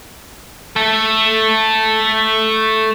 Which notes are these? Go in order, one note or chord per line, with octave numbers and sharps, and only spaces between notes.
A3 A4